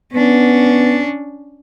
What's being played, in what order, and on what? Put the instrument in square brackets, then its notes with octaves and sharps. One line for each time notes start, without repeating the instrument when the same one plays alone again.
[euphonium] B3 [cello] C#4 D4